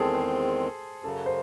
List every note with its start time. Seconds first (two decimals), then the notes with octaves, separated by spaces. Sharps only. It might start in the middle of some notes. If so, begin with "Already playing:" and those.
Already playing: E2 D#3 G#3 C4 G#4 A4
0.15 C5
1.03 F#2 C#3 F#3 A4
1.26 C5